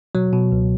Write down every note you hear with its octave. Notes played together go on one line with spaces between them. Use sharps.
B2 F#3
B2
C#2